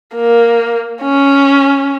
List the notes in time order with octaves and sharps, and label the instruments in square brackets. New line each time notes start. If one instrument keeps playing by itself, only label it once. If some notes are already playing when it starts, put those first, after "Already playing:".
[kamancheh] A#3
C#4